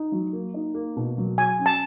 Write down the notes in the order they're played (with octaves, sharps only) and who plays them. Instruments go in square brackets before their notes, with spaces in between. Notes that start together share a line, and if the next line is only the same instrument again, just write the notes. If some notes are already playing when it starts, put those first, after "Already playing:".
Already playing: [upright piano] D#4
F#3
A#3
D#4
A#3
B2
F#3
[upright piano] F#4 [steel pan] G#5
[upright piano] C#4
[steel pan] A5